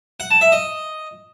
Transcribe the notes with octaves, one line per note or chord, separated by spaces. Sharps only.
F#5
A5
E5
D#5